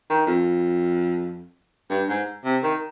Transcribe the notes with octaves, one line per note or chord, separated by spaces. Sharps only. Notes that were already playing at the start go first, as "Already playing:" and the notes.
D#3
F2
G2
G#2
C3
D#3